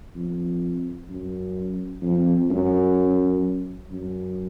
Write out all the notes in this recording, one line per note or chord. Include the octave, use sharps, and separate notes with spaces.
F2
F#2
F2
F#2
F#2